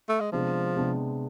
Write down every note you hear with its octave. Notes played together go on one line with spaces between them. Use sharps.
A3
G#3
C3 F3 G#3 B3 D4
C3 G#3 B3 D4